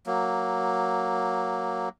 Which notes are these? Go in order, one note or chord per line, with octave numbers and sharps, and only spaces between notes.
F#3 A#3